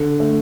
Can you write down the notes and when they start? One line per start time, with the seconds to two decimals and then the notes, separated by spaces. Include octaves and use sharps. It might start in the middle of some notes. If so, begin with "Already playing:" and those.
Already playing: D3
0.20 A3